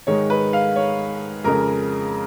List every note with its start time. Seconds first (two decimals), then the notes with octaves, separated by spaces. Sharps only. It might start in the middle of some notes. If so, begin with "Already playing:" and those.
0.07 G#2 D#3 G#3 C#5
0.30 B4
0.53 F5
0.76 C#5
1.44 F2 C#3 G#3 A#4